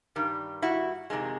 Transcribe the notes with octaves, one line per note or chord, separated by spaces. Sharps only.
G2 D#3 G3
E4 F#4
F2 C3 D#3 G#3